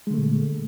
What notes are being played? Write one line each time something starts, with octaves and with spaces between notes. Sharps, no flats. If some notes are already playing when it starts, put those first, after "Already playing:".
A#2 D3 G#3 A3